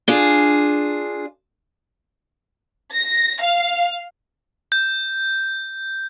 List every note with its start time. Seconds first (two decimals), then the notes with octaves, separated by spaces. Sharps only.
0.08 D4 F4 G#4
2.93 A#6
3.41 F5
4.72 G6